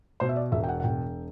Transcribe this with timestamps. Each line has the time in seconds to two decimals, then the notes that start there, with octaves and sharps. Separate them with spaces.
0.20 B2 C5
0.29 E5
0.36 D5
0.52 E1 E5
0.63 G5
0.68 F#5
0.80 F#5
0.84 E1 G5